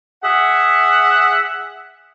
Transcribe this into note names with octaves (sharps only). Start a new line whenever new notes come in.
G#4 E5 F#5